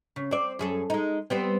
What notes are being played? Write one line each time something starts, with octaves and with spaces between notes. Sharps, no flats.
C#3
C4 D5
F#2 G#4 A4
G#3 D#4
G3 B3 C4